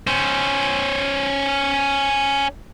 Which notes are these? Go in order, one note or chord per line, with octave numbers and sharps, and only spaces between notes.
C#4 C5